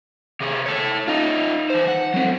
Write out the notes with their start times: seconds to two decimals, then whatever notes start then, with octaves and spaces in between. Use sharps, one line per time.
0.41 C3 G#4
0.66 A4 C#5
1.08 D#4 F4
1.70 E3 C5
1.87 F#5
2.14 F#3 C4